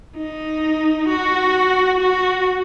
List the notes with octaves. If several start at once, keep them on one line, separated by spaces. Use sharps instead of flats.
D#4
F#4
F#4